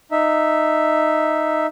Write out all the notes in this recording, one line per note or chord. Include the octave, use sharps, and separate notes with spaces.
D#4 E5